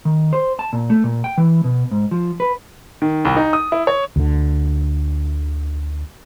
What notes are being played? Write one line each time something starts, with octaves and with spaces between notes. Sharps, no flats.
D#3
C5
A5
A#2
A3
A#2
G5
E3
B2
G#2
F3
B4
D#3
C2
D#4
D#6
E4
C#5
D2 D3